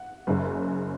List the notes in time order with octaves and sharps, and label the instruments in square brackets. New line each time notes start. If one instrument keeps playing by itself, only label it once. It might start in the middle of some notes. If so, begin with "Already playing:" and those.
Already playing: [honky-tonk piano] F#5
F#1 F#2 C#3